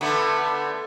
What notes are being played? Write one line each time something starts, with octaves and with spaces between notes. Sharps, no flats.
D3 A3 B3